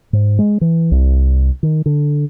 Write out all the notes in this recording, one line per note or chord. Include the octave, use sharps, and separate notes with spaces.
G#2
G#3
E3
C2
D#3
D3